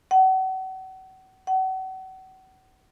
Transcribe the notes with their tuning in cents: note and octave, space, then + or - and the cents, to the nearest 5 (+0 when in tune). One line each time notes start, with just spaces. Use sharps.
F#5 +35
F#5 +35